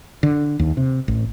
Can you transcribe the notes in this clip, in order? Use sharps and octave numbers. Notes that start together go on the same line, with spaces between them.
D3
D#2
C3
A1